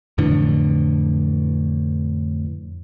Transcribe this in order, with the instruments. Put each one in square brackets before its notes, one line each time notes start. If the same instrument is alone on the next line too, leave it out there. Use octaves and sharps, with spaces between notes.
[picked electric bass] F2 A2 D3 E3